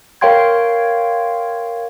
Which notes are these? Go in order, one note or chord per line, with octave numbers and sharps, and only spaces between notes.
A#4 C#5 F5 G5 C6 G#6